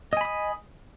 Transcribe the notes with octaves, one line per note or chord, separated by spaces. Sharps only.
D#5 G#5 B5 D#6